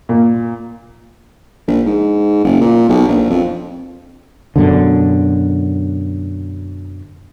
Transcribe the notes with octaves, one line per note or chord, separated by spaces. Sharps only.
A#2
A#1
G#2
F#1
A#2
B1
A#1
F2
F#2 B2 D3